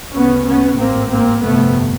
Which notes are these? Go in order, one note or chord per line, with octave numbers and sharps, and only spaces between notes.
D2 C#3 B3 C#4
B3 C#4
A1 G#2 A#3 C4
A#3 C4
G1 F2 C3 A3 B3